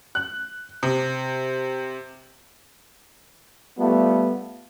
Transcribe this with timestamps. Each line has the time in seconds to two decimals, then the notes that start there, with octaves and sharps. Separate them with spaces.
0.15 F#6
0.83 C3
3.79 G3 A3 B3 F4 A4